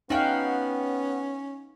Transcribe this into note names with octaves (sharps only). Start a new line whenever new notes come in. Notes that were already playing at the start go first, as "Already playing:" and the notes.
B3 C#4 D#4 F#4 F5 G5